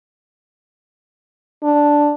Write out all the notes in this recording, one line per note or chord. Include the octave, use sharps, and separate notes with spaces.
D4